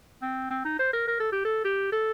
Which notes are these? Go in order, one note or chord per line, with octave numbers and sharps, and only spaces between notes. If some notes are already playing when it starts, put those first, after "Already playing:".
C4
C4
D#4
C5
A#4
A#4
A4
G4
A4
G4
A4